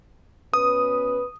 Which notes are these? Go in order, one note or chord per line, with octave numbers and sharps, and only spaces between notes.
B2 C#4 B4 D#6